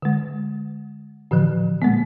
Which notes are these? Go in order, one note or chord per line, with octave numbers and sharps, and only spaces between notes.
D3 G#3
A2 D3 E3 F3
A#2 G#3 A#3 B3